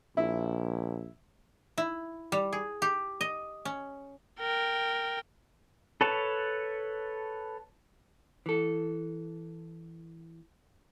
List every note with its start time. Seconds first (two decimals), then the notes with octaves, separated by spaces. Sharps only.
0.17 A#1 E4
1.78 E4
2.32 G3
2.53 G#4
2.82 G4
3.21 D#5
3.65 C#4
4.40 A#4 G5
6.01 A4 B4 C#5 A5
8.46 E3 A4